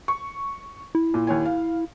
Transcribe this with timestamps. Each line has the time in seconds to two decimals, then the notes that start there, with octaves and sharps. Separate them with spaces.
0.08 C#6
0.95 E4
1.14 A#2
1.27 D#2 C#5 G#5
1.46 F5